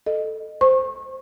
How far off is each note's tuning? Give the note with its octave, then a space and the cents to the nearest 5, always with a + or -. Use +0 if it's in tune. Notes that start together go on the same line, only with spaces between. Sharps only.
A4 +0 D#5 -20
C5 +0 C#6 -30